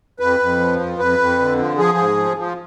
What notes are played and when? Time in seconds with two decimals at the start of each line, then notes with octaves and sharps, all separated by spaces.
0.19 F2 B4
0.40 F2
0.59 F3
0.80 F2
0.98 F2 B4
1.19 F2
1.39 D3
1.59 F3
1.77 F3 G#4
1.98 G#2
2.17 F3
2.37 F3